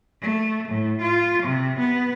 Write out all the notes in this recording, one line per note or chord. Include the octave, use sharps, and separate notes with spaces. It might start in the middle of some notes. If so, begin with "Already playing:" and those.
A3
A2
F4
C3
B3